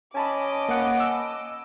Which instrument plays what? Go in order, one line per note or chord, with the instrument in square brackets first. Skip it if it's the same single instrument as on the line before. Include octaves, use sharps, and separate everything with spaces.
[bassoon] C#4 [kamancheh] D#5 D6 [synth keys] G#5 A5 B5
[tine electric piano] A#3 F#5
E6